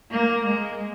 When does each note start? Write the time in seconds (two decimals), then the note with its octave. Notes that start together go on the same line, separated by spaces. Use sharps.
0.11 A#3
0.46 G#3